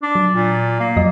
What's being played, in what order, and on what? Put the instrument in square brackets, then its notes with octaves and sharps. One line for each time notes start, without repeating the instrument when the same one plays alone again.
[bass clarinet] D4
[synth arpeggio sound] F#3
[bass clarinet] A#2
A#3
[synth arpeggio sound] F2 F#3 D#5